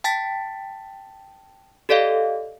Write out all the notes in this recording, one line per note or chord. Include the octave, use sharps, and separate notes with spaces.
G5 A5 A6 B6
G4 A4 D5 D#5 F5